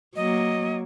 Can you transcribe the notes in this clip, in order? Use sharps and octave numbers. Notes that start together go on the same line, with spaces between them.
F#3 A#3 D#5